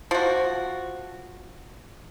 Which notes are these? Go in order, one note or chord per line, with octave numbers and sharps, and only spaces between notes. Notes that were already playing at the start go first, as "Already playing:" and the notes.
F3 F#4